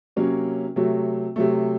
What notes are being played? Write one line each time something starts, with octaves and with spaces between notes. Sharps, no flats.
C3 F#3 A#3 C#4
C3 F#3 A3
C3 F#3 A3